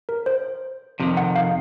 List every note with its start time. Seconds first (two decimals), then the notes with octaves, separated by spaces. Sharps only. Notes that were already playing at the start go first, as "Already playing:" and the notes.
0.09 A#4
0.26 C5
1.00 F2 C3 D#3
1.17 F#5
1.36 F5